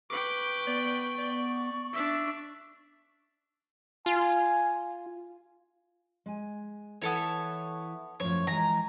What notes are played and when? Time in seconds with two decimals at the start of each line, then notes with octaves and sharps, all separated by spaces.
0.10 B4 G5 C#6 D6
0.67 B3 D5
1.18 D5
1.93 D4 E5
4.06 F4 G#5
6.26 G#3 G#5
7.02 E3 B3 E4 A4 C#5
8.20 F#2 A2 F3 C#5
8.47 E3 G#3 A#5